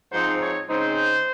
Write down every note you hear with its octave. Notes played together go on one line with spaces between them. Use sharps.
G#2 F3 C4 D#4 C5
C#5
C#3 G#3 C4 D#4 C5